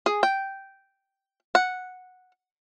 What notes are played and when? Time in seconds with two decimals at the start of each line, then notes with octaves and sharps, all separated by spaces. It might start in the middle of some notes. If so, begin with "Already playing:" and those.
0.06 G#4
0.23 G5
1.55 F#5